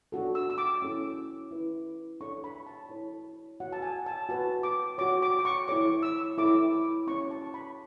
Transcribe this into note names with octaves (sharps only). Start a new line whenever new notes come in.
D4 F#4 A4
E6
E6
D6
C#4 E4 A4 C#5
E4 B4
D4 A4 C#5 C#6
B5
A5
E4 A4 C#5
F#4 C#5 F#5
A5
G#5
A5
F#4 B4 A5
D6
F#4 C#5 D6
D6
D6
C#6
E4 A4 C#5 D6
E6
E4 A4 C#5 D6
D6
C#4 G#4 C#5 C#6
A5
B5